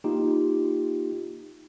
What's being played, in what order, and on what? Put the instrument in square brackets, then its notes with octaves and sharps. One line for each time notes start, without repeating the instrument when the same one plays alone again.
[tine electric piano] A#3 D#4 F4 G4